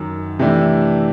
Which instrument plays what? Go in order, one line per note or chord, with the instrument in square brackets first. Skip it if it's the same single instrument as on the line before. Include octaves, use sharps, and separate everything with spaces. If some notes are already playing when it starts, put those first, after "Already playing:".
Already playing: [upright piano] F#2 D#3 F#3
C3 E3 A3 D4